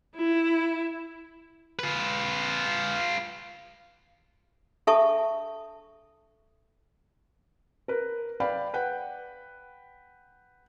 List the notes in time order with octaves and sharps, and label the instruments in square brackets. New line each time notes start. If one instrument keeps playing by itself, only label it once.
[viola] E4
[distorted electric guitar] F4 B4
[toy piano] D4 A4 E5 A5 C#6 D#6
[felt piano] A#4 B4
B4 D5 F5 G5 B5
B4 F#5 G5